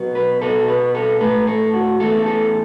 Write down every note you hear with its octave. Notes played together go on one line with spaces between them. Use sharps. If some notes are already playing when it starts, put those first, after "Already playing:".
Already playing: B2 F#3 B3
B4
B2 B3 A4
B4
A4
A2 A3 B4
A4
F#4
E2 E3 A3 A4
A4